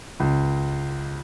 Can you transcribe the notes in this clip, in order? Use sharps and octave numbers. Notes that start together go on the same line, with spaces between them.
C#2